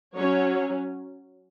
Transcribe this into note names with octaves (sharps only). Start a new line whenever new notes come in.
F#3 C#4 C#5